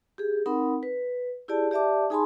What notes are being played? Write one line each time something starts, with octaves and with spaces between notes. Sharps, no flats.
G4 G#4
C4 D#4 A#4 F#5 B5
B4
E4 G4 G#4 D5 A5
G4 D5 E5 A5 D6
D#4 G#4 G#5 A5 B5 C6